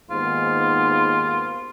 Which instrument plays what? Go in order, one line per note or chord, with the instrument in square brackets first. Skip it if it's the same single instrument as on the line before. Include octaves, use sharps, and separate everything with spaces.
[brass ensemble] D#2 G#2 B3 [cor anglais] F4